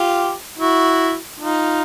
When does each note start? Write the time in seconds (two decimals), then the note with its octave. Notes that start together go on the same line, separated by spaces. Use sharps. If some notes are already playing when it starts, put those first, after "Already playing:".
Already playing: F4 G4
0.58 E4 F#4
1.40 D#4 F4